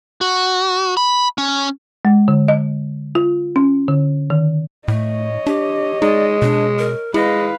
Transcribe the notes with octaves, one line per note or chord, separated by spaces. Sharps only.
F#4
B5
C#4
G#3
D3
D#5
F4
C#4
D3
D#3
A2 A3 C#5 D#5
D4 G4
G#3 D#4 D5
B2 D4
A#4
G#3 E4 B4 D#5 F5